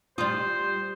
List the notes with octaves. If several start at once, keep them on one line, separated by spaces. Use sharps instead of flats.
G3 F4 C5 C6 D#6